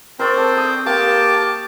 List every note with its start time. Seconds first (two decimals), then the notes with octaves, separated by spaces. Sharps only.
0.19 C4 A#4 C5 D5 C#6
0.38 A4
0.57 D#6
0.86 A#3 G4 G5 A5 D6